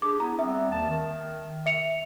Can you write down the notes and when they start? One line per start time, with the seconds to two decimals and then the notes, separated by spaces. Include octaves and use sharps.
0.02 D4 G4 G#4 D6
0.20 B3 E4 A#5
0.39 G3 B3 C4 E5
0.72 D#2 D#3 A5
0.89 D#3
1.66 E5 C#7 F7